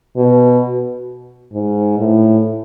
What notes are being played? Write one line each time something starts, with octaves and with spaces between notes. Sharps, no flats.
B2
G#2
A2